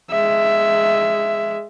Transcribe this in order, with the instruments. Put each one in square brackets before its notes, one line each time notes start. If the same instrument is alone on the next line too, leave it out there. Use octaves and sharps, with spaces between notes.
[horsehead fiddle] G#3 E5